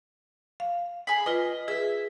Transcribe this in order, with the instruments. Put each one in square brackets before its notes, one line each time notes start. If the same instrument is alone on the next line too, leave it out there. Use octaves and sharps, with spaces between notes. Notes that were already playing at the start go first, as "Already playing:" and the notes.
[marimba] F5
[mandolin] G#4 B5
[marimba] F4 B4 [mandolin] D#5
[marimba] G#4 B4 [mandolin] E5